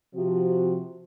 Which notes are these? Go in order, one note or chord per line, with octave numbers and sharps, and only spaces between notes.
C3 F3 F#4